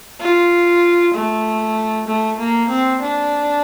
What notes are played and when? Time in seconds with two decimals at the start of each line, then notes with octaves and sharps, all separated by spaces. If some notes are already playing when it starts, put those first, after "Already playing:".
0.20 F4
1.14 A3
2.07 A3
2.39 A#3
2.69 C4
3.01 D4